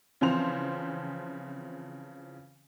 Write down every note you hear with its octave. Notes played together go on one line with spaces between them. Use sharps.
C#3 E3 F3 C4 C5 F7